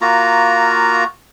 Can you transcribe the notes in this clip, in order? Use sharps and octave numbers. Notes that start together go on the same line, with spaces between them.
A#3 F4 F#4 A#5